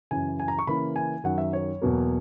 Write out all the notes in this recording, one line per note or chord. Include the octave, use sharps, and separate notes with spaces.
F#2 C#3 E3 G#5
G#5
A#5
C#6
C#3 E3 A#3 C#4 B5
G#5
F#2 D#3 F#3 F#5
E5
C#5
E2 B2 F#3 A#3